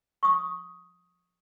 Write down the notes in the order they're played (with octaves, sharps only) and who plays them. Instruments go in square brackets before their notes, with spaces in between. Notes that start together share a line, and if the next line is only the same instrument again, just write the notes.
[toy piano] C#6 D#6